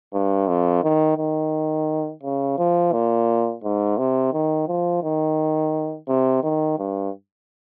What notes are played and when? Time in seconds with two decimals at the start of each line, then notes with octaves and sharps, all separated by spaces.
0.13 G2
0.48 F2
0.83 D#3
1.17 D#3
2.23 C#3
2.58 F3
2.92 A#2
3.63 G#2
3.98 C3
4.33 D#3
4.68 F3
5.03 D#3
6.08 C3
6.43 D#3
6.78 G2